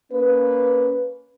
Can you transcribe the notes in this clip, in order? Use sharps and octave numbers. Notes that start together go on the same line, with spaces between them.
A#3 C#4 B4